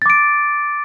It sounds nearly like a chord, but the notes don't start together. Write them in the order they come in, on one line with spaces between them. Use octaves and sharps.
A6 D6 D7